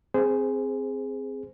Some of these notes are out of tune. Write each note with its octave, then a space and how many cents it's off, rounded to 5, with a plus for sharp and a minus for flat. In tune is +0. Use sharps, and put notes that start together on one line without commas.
C4 +0 G#4 +0 C5 -25